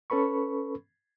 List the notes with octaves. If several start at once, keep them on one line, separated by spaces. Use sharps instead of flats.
C#4 A4 B4 B5 C#6